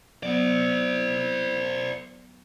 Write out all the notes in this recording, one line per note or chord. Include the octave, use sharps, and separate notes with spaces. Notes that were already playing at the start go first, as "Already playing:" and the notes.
F#3 B3 C5 D5